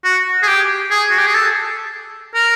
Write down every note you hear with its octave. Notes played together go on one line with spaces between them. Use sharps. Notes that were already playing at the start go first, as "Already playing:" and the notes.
F#4
G#4
G4
G#4
F#4
G4
G#4
A4
A#4